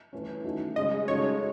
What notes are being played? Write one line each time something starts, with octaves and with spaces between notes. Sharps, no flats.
E3 A3 C#4
D#3 A3 D#4 F#4
C#3 G#3 C#4 G#4 D#5
C#3 G#3 D#4 F#4 A4 C#5